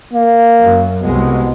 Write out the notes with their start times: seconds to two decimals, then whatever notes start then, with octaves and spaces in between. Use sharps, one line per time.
0.13 A#3
0.59 F#2
1.01 C2 B2 G#3